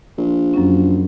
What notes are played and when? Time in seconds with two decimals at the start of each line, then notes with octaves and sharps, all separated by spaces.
0.18 A#1
0.54 F#2 F#3 C#4